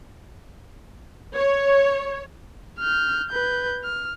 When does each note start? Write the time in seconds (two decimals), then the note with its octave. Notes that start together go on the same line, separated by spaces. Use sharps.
1.36 C#5
2.79 F6 G6
3.30 B4 G6
3.84 F6